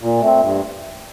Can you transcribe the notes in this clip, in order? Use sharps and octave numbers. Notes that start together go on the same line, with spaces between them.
A#2
A3 C4
G2